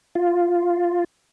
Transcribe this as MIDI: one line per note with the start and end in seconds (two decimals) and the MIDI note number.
0.15 1.04 65